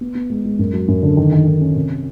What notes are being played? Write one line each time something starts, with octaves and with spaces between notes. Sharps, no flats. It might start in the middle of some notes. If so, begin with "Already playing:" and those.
B3
B3
G#3
G#3
F#2
F#3
F#2
D3
D#3
D#3
D#3
C#4
C3